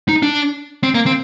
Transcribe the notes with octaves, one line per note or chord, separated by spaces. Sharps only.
D#4
D4
C4
A#3
C4